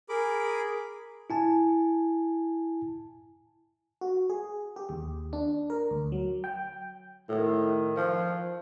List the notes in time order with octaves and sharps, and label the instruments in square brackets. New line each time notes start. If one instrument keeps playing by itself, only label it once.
[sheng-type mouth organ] G#4 A#4 B5 D6
[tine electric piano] E4 G#5 A5
[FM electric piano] F#4
G#4
G4
D#2
D4
A#4
D2
F#3
G5
[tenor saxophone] A2 [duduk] D#3
[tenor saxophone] F3